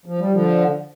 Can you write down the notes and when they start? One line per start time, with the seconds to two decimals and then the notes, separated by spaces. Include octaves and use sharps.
0.06 F3
0.19 G3
0.32 D3 F3